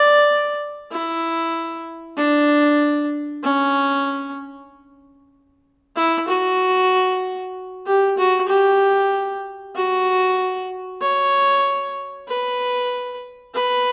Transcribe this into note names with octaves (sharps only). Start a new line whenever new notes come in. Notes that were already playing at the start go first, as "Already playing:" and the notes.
Already playing: D5
E4
D4
C#4
E4
F#4
G4
F#4
G4
F#4
C#5
B4
B4